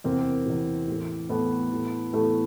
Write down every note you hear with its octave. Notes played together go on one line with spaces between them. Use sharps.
E2 C3 E3 A#3 C4
E2 C3 E3
A2 E3
A2 E3 A3 B3
A2 E3
A2 E3 A3 B3